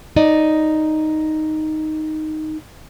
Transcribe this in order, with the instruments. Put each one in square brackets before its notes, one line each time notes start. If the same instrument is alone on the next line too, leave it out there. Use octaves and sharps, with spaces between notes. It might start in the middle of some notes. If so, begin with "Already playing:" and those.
[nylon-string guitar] D#4 D5 D#5